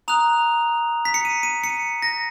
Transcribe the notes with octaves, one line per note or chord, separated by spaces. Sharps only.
A#5 D#6 F#6 F7
B6
C#7
D#7
D#7
C#7
A#6